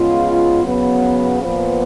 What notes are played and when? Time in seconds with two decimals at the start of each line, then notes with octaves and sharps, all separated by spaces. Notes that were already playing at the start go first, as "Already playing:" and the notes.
Already playing: C#3 G#3 B3 F4
0.63 C#3 F#3 B3
1.41 A#2 F3 B3